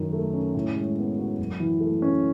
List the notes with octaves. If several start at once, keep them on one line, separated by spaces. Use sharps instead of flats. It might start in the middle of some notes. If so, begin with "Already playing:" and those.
Already playing: F#2 D#3
A3
C#4
A2
G#3
B3
F#4
F#2
E3
A3
C#4